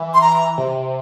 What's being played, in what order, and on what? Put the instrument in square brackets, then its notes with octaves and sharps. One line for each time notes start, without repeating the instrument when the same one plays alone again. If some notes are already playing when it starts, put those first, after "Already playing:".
Already playing: [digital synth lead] E3
[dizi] C6
A#5
[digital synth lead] C3